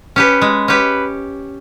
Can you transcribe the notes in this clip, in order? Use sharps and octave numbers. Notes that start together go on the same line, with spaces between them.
C#4 G4 B4
G#3
C#4 G4 B4